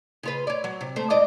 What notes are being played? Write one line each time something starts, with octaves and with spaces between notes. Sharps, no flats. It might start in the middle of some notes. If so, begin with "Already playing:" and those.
C#3 F4 B4
C#5 D5
F#3
C3
A3 C5
G#2 D5 D#5